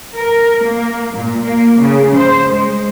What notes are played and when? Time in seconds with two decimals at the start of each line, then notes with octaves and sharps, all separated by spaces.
0.15 A#4
0.63 A#3
1.15 A#2
1.44 A#3
1.80 C#3
2.15 C5
2.53 G#3